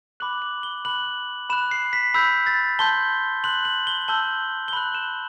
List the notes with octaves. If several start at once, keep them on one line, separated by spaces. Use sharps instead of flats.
B5 D6 F#6 F#7
F#7
G7
B5 F#6 F#7
B5 F#6 E7
C7
B6
B5 E6 G6 B6
A6
A5 C6 G6 G7
C6 F#6 F#7
F#7
G7
A5 E6 G6 G7
G7
B5 F#6 F#7
E7